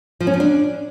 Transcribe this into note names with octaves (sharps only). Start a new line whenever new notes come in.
F3
C#4
F3
D4